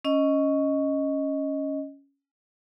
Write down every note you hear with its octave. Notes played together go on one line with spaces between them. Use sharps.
C#4 D#5